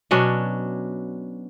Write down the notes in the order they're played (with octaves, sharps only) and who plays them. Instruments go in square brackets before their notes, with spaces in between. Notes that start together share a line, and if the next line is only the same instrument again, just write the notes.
[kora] B2 F#3 C#4 D4